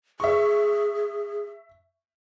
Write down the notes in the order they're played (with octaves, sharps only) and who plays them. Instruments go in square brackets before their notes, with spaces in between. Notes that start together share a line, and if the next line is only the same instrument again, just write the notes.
[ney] G#4 [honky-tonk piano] E5 C#6